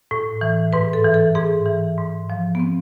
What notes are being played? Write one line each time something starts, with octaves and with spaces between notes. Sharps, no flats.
A2
E3
G#2 B4
A4
E3
A4
G#2 G#4
E3
G#2
F3
B3
C4